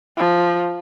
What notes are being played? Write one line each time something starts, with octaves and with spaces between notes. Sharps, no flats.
F3